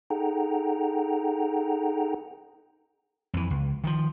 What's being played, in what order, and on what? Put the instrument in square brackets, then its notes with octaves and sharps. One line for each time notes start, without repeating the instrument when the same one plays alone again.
[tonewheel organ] D#4 G#4 A4 F#5 G5 A#5
[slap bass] F2 E3
C#2
D#3 F3